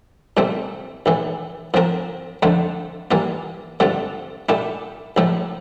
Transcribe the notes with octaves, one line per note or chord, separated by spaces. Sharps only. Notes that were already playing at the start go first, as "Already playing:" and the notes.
C2 A#2 A3 C4
A#1 A2 E3
A2 F3 C4 F4 A#4
F2 D3 F3 A3
E3 G3 A#3 F4
G2 D3 A3 C4 F4
A#2 A3 E4 G4
A#1 A2 F3 A3